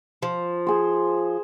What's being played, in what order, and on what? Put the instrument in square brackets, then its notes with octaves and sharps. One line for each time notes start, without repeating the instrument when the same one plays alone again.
[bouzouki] F3
[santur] G#4 C5